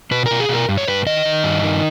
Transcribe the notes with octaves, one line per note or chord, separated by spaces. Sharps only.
B2 B4
A#4
B2
G#4
B2 A#4
G2
C#5
G2 B4
D#3 D#5
D#3
G2
D#3